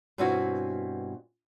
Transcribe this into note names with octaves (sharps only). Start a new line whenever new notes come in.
G2 B2 C4 C#4 E4 F#4